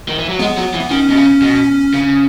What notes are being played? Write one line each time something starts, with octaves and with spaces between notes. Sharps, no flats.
D#3
E3
F#3
G#3 B3
F#3
E3
B3
D#3 C#4
B2
C#3
B2
C#3